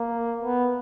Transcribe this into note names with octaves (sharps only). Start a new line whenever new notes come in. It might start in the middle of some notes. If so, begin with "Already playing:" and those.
Already playing: A#3
B3